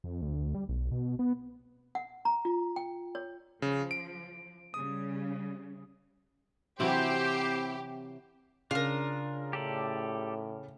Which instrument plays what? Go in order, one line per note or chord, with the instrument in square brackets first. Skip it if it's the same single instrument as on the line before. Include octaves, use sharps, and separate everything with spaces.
[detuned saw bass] F2
D2
G3
B1
B2
B3
[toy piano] F#5
A#5
F4
G5
C#5
[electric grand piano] C#3 [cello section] F3
[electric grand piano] D7
[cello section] C#3 G3 [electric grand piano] D#6
[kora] C3 E3 F#3 [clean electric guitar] C4 E4 [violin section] G4 [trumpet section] C5
[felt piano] C#3 [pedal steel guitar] D4 [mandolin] F4 A#4
[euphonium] A2 [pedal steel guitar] G4 A4 D5